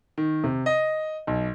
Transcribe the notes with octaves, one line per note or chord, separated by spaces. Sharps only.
D#3
C3
D#5
B1